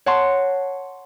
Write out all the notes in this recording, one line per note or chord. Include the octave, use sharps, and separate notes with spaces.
C#5 F#5 A5 C6